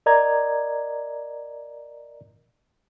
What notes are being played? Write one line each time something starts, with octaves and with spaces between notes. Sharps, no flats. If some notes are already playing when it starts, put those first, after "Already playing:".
A#4 D5 D#5 A#5 G#6